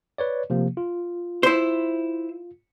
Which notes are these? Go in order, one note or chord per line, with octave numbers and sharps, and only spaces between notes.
B4 C#5 D5
C3 F3 A#3
F4
E4 C5